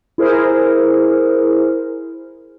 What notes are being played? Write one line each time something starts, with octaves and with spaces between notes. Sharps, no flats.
E4 G#4 A#4 C5